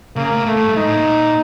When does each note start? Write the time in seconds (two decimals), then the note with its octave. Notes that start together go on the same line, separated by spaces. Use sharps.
0.16 C#3 A#3
0.32 A2
0.47 A2 A3
0.57 A2
0.67 G2
0.76 G#2 D#4
0.87 A2
0.97 A#2